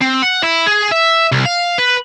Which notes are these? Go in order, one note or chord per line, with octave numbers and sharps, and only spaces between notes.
C4
F#5
E4
G#4
E5
C2
F5
B4